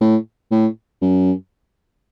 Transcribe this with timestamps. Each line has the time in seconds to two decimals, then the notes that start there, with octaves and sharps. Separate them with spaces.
0.01 A2
0.51 A2
1.01 F#2